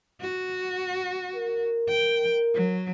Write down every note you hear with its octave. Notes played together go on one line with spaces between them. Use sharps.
F#4
A#4
G5
F#3